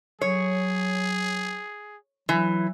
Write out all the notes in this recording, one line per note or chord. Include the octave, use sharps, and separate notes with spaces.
F#3 G#4 C#5
E3 F#3